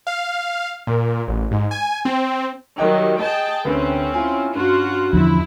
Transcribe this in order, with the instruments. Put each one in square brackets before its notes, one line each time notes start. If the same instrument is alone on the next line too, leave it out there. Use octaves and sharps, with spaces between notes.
[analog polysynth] F5
A#2
A1
G#2
G#5
C4
[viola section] D#3 F#3 G3 [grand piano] D#5 G5
[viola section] G#4 G5 A5 [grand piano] D#5
[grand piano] D2 C3 B4 [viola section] C4 C#4
[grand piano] E4 F4 G#5
[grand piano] G2 C#4 [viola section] F4 F#4
[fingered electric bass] E2 D3 F3 [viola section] E4